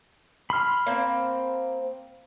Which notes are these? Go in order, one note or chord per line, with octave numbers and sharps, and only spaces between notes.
B5 C6 F6
A#3 C4